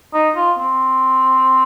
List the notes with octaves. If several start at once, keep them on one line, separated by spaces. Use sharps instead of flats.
D#4
F4
C4